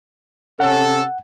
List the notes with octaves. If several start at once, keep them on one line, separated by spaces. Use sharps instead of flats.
C3 C#4 A4 F#5